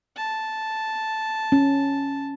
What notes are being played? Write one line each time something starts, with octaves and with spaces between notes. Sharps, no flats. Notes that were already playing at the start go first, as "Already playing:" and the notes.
A5
C#4